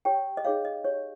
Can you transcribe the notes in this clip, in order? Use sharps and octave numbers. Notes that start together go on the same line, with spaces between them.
G4 C#5 G5
D#5
D#4 G#4 C#5 F5
D#5
G4 C#5